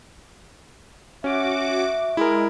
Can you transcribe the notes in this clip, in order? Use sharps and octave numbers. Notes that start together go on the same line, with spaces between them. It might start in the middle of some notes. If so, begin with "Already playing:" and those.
C#4 F#4 E5 D6
G#3 E4 A#4